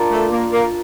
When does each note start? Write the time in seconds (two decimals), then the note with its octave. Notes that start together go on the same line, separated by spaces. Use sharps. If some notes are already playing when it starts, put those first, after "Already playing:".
Already playing: D4 F4 A#4
0.10 A3
0.30 A#3
0.51 A#3